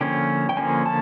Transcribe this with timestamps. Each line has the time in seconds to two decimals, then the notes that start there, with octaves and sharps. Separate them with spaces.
0.01 D3 F3 A#3 C#4 G5
0.49 G5
0.57 D3 F3 A#3 C#4 G#5
0.86 A5